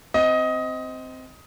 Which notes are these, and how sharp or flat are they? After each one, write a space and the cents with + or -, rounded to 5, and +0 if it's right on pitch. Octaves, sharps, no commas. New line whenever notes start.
C4 -10 D#5 +15